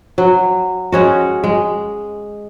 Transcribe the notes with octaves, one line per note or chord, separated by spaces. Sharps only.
F#3
G#3 C#4 F#4
G#3